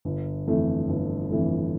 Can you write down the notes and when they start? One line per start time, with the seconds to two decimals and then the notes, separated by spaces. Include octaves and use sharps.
0.05 G1
0.47 F2 E3 A3
0.88 G1
1.30 F2 E3 A3